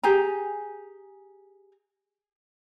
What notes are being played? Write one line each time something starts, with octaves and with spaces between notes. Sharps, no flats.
G4 G#4 G#5 A#5